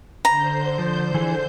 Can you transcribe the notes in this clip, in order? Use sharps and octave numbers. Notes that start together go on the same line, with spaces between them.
D3 C5 A#5 G6
F3
E3 G#4